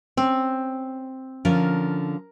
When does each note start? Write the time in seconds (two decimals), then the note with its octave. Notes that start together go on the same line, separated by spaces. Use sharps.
0.17 C4 C#4
1.45 D3 F3 C#4 A#4